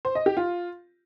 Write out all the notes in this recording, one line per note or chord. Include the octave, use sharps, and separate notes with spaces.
C5
D#5
G4
F4